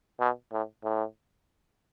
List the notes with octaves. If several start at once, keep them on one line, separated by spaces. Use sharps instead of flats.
B2
A2
A2